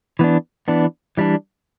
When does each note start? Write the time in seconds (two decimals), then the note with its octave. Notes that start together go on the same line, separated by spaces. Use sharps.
0.19 E3 B3 D4
0.68 E3 B3 D4
1.17 E3 G3 D4